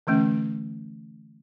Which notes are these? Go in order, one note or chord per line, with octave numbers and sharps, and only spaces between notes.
D3 E3 A3 C#4